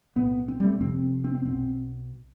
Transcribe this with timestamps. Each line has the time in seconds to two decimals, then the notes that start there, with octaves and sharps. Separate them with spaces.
0.16 B1 A2 B3
0.48 C4
0.60 G3
0.64 A3
0.80 F1 F2 C3 C4
1.24 C4
1.35 C4
1.45 B1 B2 C4